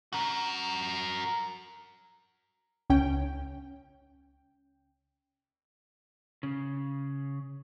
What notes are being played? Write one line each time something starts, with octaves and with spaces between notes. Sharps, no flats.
F#4 A#4
C#2 C#4 G5
C#3